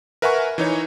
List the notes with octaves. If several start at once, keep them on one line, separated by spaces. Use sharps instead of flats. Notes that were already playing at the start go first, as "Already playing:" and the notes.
A#4 B4 E5 F#5 G#5 C#6
E3 D#4 C#5